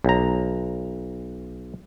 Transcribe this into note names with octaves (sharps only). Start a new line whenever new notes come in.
B1 A#5